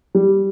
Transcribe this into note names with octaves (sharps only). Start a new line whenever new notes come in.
G3